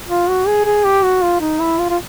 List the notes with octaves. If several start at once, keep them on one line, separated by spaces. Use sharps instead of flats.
F4
F#4
G#4
G#4
G4
F#4
F4
D#4
E4
F4
F4